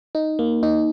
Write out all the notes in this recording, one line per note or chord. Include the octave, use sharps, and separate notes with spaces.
D#4
A#3
D#4